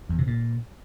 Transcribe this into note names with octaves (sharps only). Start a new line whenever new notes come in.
E2
C3
A#2